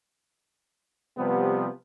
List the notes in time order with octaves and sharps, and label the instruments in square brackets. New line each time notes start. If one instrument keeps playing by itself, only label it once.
[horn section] C3 F3 G3 B3